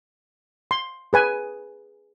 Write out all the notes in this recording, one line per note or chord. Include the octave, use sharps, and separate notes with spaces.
C6
G#4 B4 G#5